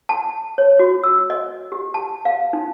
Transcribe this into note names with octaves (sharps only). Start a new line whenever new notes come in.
A5
C#5
F#4
E6
D#5
G4
A5
F5
D#4